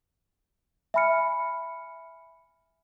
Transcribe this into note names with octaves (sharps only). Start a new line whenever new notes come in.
E5 G#5 B5 F6 C#7